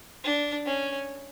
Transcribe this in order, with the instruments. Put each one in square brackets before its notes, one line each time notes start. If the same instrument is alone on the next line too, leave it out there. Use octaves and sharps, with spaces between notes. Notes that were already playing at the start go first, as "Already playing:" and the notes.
[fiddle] D4
C#4